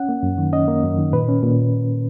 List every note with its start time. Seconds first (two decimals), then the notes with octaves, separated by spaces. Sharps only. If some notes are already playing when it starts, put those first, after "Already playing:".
Already playing: C#4 F#5
0.09 A#3
0.23 F#2
0.38 D#3
0.53 C#4 D#5
0.68 A#3
0.83 F#2
0.98 D#3
1.13 A#2 B4
1.28 C#4
1.43 A#2